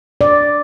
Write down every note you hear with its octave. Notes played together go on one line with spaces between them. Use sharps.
D5